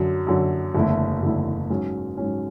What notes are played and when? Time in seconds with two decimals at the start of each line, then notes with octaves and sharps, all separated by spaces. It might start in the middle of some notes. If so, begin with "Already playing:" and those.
Already playing: F#2 D3 F#3
0.27 F#2 D3 F#3
0.75 F#1 E2 D3 A3 E4
1.22 F#1 E2 D3 A3 E4
1.70 G#2 F#3 C#4
2.17 G#2 F#3 C#4